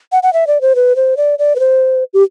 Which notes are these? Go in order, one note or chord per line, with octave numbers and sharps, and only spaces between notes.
F#5
F#5
E5
D5
C5
B4
C5
D5
D5
B4
C5
G4